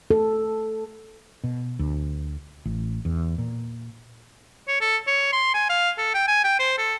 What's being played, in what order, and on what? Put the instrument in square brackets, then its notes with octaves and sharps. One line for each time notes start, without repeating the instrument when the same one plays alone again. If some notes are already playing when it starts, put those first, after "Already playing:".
[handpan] A4
[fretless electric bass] B2
D2
A1
E2
A#2
[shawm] C#5
A4
C#5
C6
G#5
F5
A4
G5
G#5
G5
C5
A4